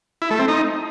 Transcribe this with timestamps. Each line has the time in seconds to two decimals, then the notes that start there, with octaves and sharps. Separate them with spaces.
0.22 E4
0.31 A3
0.39 C4
0.48 D#4